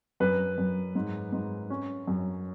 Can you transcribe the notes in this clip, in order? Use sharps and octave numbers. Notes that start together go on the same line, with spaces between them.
F#2 B4
F#2
G#2
G#2
C#4
F#2